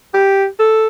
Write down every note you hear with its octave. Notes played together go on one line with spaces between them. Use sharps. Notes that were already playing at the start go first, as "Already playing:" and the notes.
G4
A4